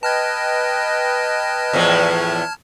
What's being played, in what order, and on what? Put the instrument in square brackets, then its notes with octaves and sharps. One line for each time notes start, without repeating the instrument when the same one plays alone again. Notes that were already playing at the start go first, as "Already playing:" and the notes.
[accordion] B4 D#5 G5 [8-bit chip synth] A5 F6 G#6
[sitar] E2 A2 F3